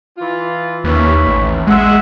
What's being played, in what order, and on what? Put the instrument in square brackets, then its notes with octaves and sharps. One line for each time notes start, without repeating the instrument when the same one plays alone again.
[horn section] E3 F4
[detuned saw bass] D#2 [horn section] C#4 B4 E5
[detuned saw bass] A1
[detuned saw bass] G#3 [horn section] E5 F#5